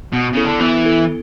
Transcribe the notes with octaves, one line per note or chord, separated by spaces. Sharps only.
B2 B3
C#3 E4 A4
D3
E3 B3
E4 A4